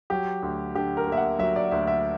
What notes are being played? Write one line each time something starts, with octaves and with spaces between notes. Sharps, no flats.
F#3 G4
D2
D3 G4
A#4
A#3
E5
F#5
F#3 E5
D5
D2 E5
E5